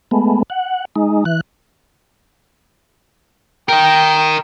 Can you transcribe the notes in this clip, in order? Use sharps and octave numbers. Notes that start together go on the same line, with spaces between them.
G#3 A3 B3
F#5
G#3 D#4
E3 F#6
A#4 D#5 G5